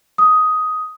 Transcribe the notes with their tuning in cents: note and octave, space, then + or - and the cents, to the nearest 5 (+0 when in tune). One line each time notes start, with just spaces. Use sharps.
D#6 +10